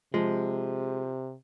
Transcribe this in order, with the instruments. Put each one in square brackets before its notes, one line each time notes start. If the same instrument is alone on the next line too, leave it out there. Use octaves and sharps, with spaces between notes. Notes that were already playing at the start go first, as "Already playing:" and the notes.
[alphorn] C3 [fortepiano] F3 [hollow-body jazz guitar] G#3